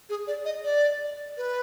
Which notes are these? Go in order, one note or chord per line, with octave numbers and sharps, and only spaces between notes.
G#4
D5
D#5
D5
B4